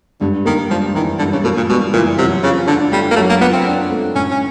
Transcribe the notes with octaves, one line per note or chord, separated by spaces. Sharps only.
G2 D3
D#3 A#3
F3 G3
D#3 E3
G2 D3
C#3
B2 A#3
A#2
B2 G3
A#2 E3
C3 F#3
C#3 F4
D3 D4
G3 A3
A#3
F#3 A3
A#3
B3 F4
C4
D4
A3
A2 C#4
C#4